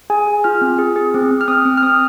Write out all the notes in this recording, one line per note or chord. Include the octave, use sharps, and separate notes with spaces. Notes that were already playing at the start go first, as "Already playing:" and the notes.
G#4 G#5
G#4
F4 F6
C4
G#4
G#4
C4
C4
F6
C4 D#6
C4
F6
C4 D#6